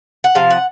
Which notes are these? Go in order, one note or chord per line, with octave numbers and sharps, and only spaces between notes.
F#5
C3 F3 F5
F#5